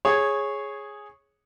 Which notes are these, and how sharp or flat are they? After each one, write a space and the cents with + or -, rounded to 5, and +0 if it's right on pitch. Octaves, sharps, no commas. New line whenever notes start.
G#4 +0 C#5 -10